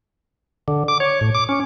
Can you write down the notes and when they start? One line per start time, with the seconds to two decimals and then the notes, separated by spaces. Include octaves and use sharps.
0.68 D3
0.88 D6
1.00 C#5
1.21 A2
1.34 D6
1.49 C#4